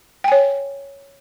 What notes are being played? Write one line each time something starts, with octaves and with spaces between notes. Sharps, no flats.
C#5 G5 G#5